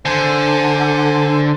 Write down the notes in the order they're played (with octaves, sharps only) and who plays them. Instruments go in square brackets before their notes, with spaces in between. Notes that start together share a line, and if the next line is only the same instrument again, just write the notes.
[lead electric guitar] D3 [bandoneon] C5 G#5